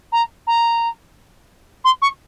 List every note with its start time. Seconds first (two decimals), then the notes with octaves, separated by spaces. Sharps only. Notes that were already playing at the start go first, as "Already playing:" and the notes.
0.12 A#5
0.47 A#5
1.84 C6
2.01 C#6